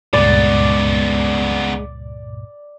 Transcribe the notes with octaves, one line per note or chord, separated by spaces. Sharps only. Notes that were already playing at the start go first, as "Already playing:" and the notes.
C#2 G2 A#2 C#3 G#3 B3 D5